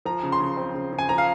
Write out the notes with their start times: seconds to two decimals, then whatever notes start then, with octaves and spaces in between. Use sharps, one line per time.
0.05 F3 A#5
0.23 C#3
0.32 C6
0.41 C#3
0.57 C4
0.74 C#3
0.93 C#3
0.99 G#5
1.09 F3 A#5
1.18 F5